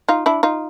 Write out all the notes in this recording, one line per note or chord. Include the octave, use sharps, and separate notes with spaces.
D#4 F4
D4 E4
D#4 F4